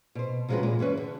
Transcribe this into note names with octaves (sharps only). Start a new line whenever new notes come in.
B2 C5
C3 F3 G#3 C#4 F#4 B4
A#2 D#3 G#3
G2 E3 C#4 B4 C#5
D3